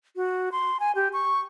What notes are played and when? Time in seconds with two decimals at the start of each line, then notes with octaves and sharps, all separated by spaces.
0.16 F#4
0.52 C6
0.80 G#5
0.95 G4
1.13 C#6